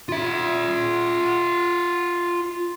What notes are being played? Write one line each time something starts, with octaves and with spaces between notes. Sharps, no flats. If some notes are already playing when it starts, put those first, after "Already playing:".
F4 E5